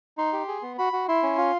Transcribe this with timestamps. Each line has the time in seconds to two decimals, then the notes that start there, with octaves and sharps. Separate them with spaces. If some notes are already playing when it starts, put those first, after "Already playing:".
0.18 D#4 C6
0.33 G4
0.48 G#4
0.62 B3
0.78 F#4 B5
0.93 F#4
1.09 E4 C6
1.23 C#4
1.37 F4